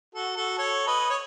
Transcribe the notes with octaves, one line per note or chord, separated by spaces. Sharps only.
F#4 A4
F#4 A4
A4 C#5
B4 D#5
C#5